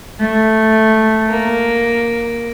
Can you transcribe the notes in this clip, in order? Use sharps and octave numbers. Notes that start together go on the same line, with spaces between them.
A3
A#3